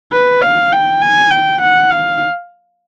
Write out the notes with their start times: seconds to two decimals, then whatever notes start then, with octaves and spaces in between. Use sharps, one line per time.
0.12 B4
0.41 F5
0.72 G5
1.01 G#5
1.31 G5
1.62 F#5
1.91 F5